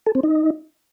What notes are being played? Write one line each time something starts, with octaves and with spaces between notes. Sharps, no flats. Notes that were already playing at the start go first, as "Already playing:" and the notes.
A4
C4
D#4